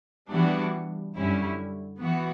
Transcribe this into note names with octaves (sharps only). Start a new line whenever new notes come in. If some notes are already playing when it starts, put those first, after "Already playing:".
E3 G3 B3 D4 F#4
F#2 D3 G3 C#4 E4
E3 B3 F#4